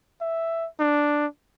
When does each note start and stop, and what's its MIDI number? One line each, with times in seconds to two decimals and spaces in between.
0.21 0.67 76
0.80 1.26 62